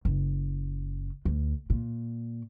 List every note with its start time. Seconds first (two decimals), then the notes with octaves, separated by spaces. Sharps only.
0.05 F#1
1.25 D2
1.70 A#2